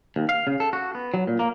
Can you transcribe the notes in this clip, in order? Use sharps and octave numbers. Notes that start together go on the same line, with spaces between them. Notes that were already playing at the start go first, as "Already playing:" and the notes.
D#2
F5
C#3
A4
F#4
B3
F#3
A#2
A#3